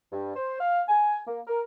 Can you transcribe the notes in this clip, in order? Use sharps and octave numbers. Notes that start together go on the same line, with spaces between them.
G2
C5
F5
G#5
A#3
A#4